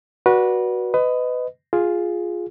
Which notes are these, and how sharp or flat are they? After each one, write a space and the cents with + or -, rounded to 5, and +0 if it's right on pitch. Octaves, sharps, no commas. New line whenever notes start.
F#4 +0 B4 -25 D5 +0
B4 +25 D#5 +0
F4 +5 G#4 +0